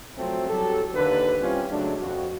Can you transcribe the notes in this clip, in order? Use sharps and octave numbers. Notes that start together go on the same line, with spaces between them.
F3 F#3 A3 C4
C2 F#3 G4 A4
D#2 D3 A#3 A4 B4
G3 C4 C#4 E4 F4 G4
C#3 F#3 G#3 A3 D4
F2 F#4